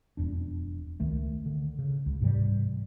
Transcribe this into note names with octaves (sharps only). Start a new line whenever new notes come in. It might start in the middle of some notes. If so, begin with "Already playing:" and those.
E1 F2 D4
C#2 D#3 A3
D3
C#3
C#2
G#2 C3 E3 G3